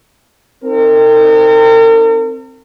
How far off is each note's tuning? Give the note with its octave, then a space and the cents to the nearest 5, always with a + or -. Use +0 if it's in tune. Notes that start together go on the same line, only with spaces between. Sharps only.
C4 +0 D#4 +0 A#4 -45